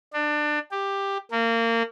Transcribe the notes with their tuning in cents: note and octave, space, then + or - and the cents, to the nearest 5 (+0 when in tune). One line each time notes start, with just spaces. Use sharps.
D4 +25
G4 +10
A#3 -25